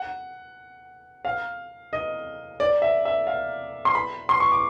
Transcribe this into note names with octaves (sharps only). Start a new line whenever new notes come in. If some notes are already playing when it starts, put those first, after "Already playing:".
Already playing: F#5
F5
D#5
D5
E5
E5
F5
C6
B5
C6
C#6
D6